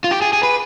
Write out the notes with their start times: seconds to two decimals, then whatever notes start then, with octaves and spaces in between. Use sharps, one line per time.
0.04 F4
0.11 G4
0.22 G#4
0.33 G#4
0.43 B4